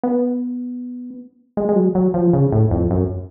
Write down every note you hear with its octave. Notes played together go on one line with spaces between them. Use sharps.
B3
G#3
G#3
F#3
F#3
F3
C#3
A2
F2
F#2